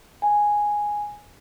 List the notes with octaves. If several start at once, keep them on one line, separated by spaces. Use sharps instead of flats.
G#5